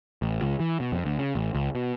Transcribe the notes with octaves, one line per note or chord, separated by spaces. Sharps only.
A1
C#2
E3
B2
F2
D2
C#3
A1
C#2
B2